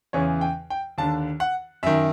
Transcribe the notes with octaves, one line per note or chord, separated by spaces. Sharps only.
E2 C#3 E3 C#5
G5
G5
D#2 D3 A5
F#5
F#2 D#3 E5